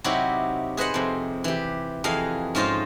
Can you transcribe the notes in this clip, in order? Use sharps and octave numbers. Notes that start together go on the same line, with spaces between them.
C3 F#3 D#4 E4 F#4 G4
G#4 B4 C5 D#5 F#5
F2 C3
E3 G4
F2 E3 G#4 D#5 F5
G#2 C#4 F4 C5 D#5 F5